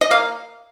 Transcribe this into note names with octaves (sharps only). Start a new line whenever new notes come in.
D#5
A#3 F5